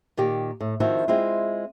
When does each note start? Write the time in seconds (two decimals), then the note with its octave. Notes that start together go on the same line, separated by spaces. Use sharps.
0.17 A#2 D#3 G4
0.61 A2
0.80 D#3 F3 C4 E4 F#4
1.08 G#3 C4 E4 F4